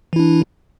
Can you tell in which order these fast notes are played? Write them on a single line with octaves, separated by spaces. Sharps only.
E3 E4 D4